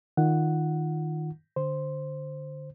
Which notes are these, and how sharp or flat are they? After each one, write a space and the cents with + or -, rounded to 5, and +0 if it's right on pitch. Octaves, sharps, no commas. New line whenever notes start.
D#3 +0 F4 +0 F#5 +0
D3 +10 C5 +0